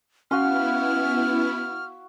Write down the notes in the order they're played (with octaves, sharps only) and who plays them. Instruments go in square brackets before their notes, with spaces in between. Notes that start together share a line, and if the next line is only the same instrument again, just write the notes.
[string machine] B3 E4 [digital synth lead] C#4 [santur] F#4 F5 C6 [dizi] F6